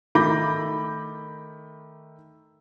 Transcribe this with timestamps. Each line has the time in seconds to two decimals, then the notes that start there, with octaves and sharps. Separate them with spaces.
0.15 D#3 A3 B5 D6 G6 A#6